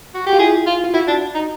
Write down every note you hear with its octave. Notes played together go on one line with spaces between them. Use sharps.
F#4
G4
F4
E4 G#4
F4
F4
E4 F#4
D4
D#4